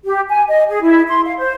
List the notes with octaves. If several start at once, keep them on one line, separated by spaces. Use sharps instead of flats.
G4
G#5
D#5
G#4
E4
C6
F5
C5